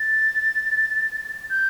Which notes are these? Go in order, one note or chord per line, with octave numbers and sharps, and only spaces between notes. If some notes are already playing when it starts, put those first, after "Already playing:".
Already playing: A6
G6